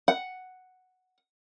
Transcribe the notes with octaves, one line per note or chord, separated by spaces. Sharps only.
F#5